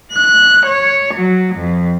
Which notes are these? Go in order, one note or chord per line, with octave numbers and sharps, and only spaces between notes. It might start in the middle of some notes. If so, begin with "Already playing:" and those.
F#6
C#5
F#3
F2